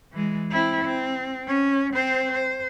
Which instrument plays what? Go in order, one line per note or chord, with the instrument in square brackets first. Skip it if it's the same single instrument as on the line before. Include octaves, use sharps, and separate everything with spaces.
[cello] E3 G#3
C4 E4
C4
C#4
C4 C5
C5